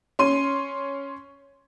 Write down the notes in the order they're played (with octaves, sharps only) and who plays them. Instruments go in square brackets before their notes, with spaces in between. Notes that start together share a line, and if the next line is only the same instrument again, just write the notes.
[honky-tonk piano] C#4 C6 D#7